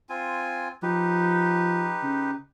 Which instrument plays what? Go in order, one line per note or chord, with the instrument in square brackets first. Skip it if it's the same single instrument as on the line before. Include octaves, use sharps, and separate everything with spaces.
[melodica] C4 F4 G#5
[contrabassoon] F3 [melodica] D#4 G4 B4
[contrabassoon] C#3